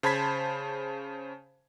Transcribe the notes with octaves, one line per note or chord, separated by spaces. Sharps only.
C#3 C5 A5 B5 G#6 B6